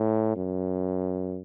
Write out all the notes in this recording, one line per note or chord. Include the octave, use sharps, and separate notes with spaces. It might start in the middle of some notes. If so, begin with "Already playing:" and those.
Already playing: A2
F#2